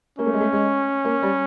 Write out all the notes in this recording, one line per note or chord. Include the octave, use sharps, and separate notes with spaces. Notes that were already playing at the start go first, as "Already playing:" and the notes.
A#3 C#4
A3
G#3
A3
G#3
A#3
G3